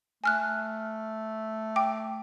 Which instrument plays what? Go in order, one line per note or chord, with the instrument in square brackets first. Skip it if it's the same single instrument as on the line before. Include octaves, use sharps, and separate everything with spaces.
[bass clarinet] A3 [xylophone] G#5 F6 F#6
[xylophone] G5 D6